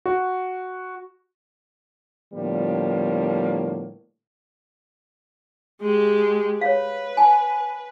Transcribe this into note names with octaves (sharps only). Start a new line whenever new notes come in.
F#4
A2 D3 F3 G3 A#3 B3
G#3 G4
B4 C#5 F5
G#5 A5